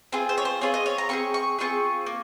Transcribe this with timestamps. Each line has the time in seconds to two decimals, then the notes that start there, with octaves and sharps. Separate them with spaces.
0.12 C4 F4 G#4
0.29 C5
0.38 C#5
0.45 C5
0.61 C4 F4 G#4 C#5
0.74 D#5
0.86 C#5
0.98 A#5
1.09 C4 F4 G#4 C#6
1.34 C#6
1.59 C4 F4 G#4 C#6
2.06 A#3